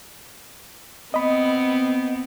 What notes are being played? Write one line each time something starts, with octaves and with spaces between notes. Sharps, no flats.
B3 C4 D#5 B5